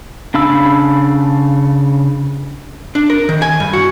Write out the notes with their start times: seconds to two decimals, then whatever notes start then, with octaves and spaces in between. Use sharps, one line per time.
0.34 C#3 D4 F5 B5 E6
2.95 D4
3.10 A#4
3.29 D#3
3.42 G#5
3.60 G2
3.73 F#4